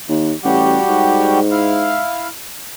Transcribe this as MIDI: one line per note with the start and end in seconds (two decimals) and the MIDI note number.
0.09 0.33 39
0.44 0.78 33
0.44 1.39 55
0.44 1.39 66
0.44 1.39 67
0.88 2.03 44
1.51 2.28 64
1.51 2.28 77